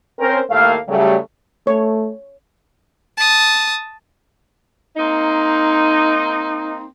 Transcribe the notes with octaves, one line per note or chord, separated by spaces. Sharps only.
C4 C#4 A#4 C5
D#2 A2 A3 A#3 F5
C#3 F#3 G3 A3
A3 C#5
A5 D#6
A#3 C4 D#4